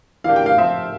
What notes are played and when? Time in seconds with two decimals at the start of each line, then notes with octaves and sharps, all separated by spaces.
0.24 E3 A#3 D4 G4 F5
0.36 G5
0.46 F5
0.57 F3 C4 F4 E5